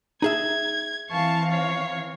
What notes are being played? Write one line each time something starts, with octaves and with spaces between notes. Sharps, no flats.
D#4 G#4 E5 G#6
E3 C4 F5 A5 C#6
C#5